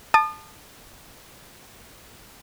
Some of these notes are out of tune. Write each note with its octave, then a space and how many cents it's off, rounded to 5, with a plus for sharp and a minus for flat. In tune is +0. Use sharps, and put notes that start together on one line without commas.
A5 +0 D#6 -40